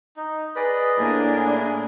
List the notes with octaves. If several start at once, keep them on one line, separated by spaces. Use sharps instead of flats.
D#4
G#4 B4 D5 D#5
A2 A#3 D4 G#5
E4 G#4